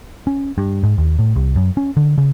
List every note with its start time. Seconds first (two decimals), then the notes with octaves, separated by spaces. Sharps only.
0.27 C#4
0.58 G2
0.83 G#2
0.98 D#2
1.19 A2
1.36 C2
1.56 F#2
1.77 C#4
1.97 D3
2.18 C#3